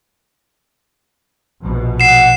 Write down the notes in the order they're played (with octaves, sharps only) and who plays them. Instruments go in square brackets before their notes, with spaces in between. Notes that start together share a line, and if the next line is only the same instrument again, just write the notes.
[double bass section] A#1 B2
[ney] F#5 [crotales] C7 E7